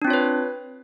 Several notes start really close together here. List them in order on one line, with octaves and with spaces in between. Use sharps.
D4 C4 F4 C#5 B4